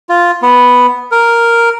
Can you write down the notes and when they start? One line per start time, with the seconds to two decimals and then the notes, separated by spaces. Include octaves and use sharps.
0.09 F4
0.42 B3
1.12 A#4